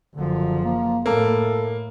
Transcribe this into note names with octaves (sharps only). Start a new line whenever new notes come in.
F#1 D3 F3
A#3
A2 A#3 A4